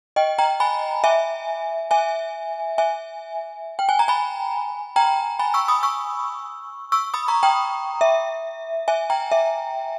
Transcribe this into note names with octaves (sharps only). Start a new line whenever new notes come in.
D#5 G5
G5 A#5
G#5 B5
E5 G#5
E5 G#5
E5 G#5
G5
G#5
A#5
G#5 B5
G5 A#5
G#5 B5
C#6 E6
B5 D#6
C#6 E6
C#6 E6
B5 D#6
A#5 C#6
G5 A#5
E5
E5 G#5
G5 A#5
E5